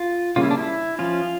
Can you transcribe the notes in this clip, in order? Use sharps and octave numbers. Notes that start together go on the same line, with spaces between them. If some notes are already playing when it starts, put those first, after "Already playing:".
Already playing: F4
C#3 G3 A#3 C#4 F4
E4
D4
E4
F3 C#4 F4